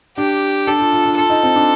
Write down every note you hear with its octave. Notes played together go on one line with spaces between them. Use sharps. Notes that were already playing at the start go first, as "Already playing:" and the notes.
D4 G4
D4 A4
F4
F4
D4
F4 A4
D#4
C4
D4